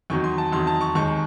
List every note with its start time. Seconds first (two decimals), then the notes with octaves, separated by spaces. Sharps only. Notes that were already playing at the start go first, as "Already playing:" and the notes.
0.10 E2 D#3 F#3 C#6
0.24 C6
0.38 A5
0.52 E2 D#3 F#3 C6
0.67 A5
0.81 C#6
0.95 D#2 D#3 G#3 C#6